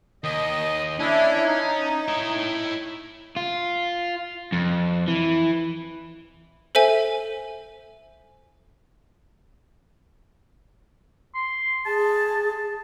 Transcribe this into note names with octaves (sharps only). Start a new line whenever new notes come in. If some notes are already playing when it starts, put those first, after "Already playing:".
D#2 D#5
C#4 D4 E4
D#4
E4 C#5
F4
F2
E3
A4 C5 E5 G#5
C6
G#4 A5